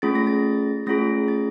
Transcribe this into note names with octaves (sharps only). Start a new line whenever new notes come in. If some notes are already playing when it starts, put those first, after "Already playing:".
A3 C#4 F4 G#4 A6
A#6
A6
A3 C#4 F4 G#4 A#6
A6